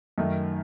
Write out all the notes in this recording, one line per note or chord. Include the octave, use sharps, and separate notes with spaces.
F#2 D#3 A3